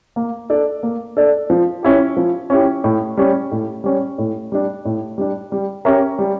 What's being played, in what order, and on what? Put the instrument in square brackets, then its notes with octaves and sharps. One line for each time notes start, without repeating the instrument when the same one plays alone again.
[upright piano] A#3
D4 A4 D5
A#3
D4 A4 D5
F3
C#4 E4 G4
F3
C#4 E4 G4
A2
G3 C#4
A2
G3 C#4
A2
G3 D4
A2
G3 D4
G3
C#4 G4 A#4 E5
G3